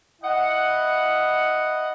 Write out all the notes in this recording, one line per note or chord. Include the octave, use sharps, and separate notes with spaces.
E4 D#5 F#5